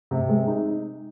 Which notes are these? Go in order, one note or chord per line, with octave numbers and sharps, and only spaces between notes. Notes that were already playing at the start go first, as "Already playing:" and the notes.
C3
G#3
D#4